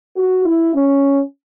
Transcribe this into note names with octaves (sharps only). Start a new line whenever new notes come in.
F#4
E4
C#4